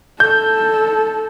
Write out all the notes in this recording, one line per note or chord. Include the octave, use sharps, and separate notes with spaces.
A4 G6